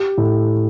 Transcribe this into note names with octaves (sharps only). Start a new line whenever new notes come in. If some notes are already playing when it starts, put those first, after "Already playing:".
Already playing: G4
A2